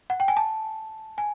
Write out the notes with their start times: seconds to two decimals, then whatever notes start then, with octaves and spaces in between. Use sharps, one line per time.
0.10 F#5
0.20 G5
0.28 G#5
0.37 A5
1.18 G#5